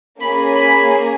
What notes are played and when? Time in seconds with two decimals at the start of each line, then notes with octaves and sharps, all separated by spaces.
0.21 A#3 C#4 G#4 B5
0.55 B5